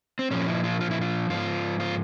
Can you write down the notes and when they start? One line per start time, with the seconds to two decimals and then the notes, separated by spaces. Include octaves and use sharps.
0.19 C4
0.31 A#2 F3 C#4
0.48 E4
0.64 F4
0.81 F4
0.91 E4
1.01 F4
1.30 G#2 F3 F4
1.80 F4